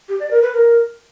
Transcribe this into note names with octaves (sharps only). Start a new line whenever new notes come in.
G4
D5
A#4
B4
A#4